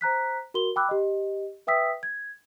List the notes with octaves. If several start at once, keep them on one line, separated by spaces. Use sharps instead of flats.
C5 A#5 F#6 B6
F#4 A#4 C6 G7
G5 B5 D6 E6 F#6
G4 D#5
B4 E5 G5 D#6 E6 B6
G#6